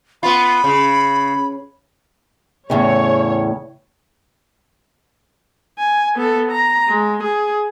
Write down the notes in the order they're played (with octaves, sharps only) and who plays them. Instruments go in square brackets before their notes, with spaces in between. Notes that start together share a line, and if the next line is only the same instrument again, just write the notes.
[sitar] B3 F4 [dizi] B5
[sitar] C#3
[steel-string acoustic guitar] E2 A2 C#3 [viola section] C#5
[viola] G#5
B3 A4
A#5
G#3
G#4